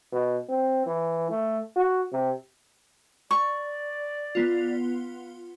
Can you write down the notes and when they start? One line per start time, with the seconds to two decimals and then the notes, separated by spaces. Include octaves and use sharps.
0.12 B2
0.49 C4
0.86 E3
1.30 A3
1.76 F#4
2.12 C3
3.31 D5 C#6
4.35 B3 F4